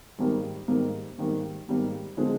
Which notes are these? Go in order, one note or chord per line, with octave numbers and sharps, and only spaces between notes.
G#2 D#3 G3 A#3
G#2 D#3 G3 A#3
G#2 D#3 G3 A#3
G#2 D#3 G3 A#3
D3 F3 G#3 C4 F4